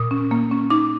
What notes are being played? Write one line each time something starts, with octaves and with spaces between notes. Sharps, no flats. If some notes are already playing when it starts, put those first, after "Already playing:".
Already playing: A#2 D#6
C#4
A#3
C#4
D#4 D6